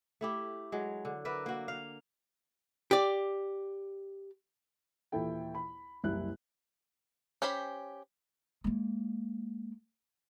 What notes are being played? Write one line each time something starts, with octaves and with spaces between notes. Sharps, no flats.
A3 E4 G4
F#3 G#3
D3
A#4 B4 D5 E5
A#3 F#4
F5
G4 D5
D#2 A#2 E3 E4 A4 G5
B5
F#1 C2 G3 E4 F#6
C#4 G4 C5 B5
G#3 A#3